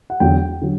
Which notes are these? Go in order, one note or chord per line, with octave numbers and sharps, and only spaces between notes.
F#5
E2 D3 F#3 G5
D3 F#3